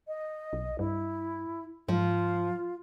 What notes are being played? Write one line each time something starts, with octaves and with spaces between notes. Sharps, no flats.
D#5
B1
G2 E4
G#2 F3 F4